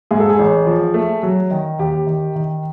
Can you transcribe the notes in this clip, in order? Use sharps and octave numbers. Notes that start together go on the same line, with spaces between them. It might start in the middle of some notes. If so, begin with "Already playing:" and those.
G#2 G#4
A4
G#4
A1
F3
A3
F#3
D#3
D#2 G4
D#3
D#3